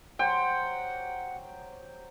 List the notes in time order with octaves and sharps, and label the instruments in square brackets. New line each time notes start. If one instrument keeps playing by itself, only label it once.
[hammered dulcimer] F#3 G4 C5 [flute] F#5 [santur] G5